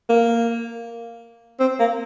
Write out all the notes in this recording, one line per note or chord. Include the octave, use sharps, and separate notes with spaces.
A#3
C4
A#3